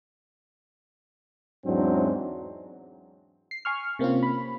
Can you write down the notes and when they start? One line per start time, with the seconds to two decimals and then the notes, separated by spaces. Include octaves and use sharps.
1.65 E2 G#2 F#3 C4 D4 E4
3.51 C7
3.65 G#5 C#6 F6
3.99 C3 A#3 C4 C#4 F4
4.23 B5